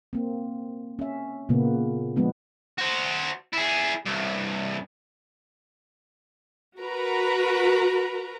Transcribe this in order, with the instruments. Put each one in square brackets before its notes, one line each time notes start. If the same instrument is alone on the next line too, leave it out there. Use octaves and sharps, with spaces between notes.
[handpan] A#3 C4
C#4 E5
A#2 C#3 A#3 B3
F3 G#3 B3 D4
[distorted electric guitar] F#4 C5
E4 G#4
C2 G2
[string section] F#4 A#4 B4 A#5